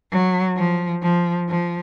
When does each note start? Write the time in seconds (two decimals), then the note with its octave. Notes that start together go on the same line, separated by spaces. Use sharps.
0.12 F#3
0.57 F3
1.03 F3
1.49 F3